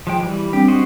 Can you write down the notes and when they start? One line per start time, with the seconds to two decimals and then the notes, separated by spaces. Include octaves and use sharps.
0.07 F3 G#3 G5
0.20 E3 G3
0.53 G3 C4 D4 G4
0.68 F#4 C5 D#5